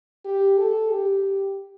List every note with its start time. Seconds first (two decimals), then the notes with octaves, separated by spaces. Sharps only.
0.25 G4
0.58 A4
0.90 G4